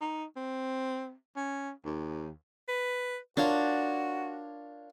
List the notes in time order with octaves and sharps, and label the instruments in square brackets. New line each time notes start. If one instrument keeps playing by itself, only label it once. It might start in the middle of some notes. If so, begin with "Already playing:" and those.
[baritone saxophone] D#4
C4
C#4
D#2
[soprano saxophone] B4
[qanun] D4 [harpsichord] F4 A#4 C#5 [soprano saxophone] F#4